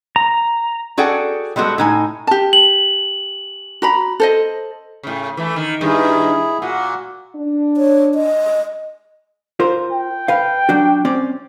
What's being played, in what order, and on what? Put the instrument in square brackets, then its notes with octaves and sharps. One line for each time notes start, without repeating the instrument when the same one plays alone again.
[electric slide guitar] A#5
[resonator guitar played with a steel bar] F#4 G#4 A4 D5 F#5 G5
G3 G#3 B3 F#4 A4
A2 D#4 G#5
[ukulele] G4 A5
[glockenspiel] F#7
[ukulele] F#4 A#5 B5
A4 C5 D#5
[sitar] A2 C#3
E3 A3
D#3
[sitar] G2 D#3 [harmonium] E4 G#4
[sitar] A#2 [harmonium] F#4 F#5
[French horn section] D4
[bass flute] C#5
D#5
[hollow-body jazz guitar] F4 A#4 C5
[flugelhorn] G5
[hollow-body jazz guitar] B4 F5
F#3 D4 F#4
C4 C#4 D5